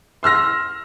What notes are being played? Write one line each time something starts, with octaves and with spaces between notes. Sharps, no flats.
C6 E6 F6 A#6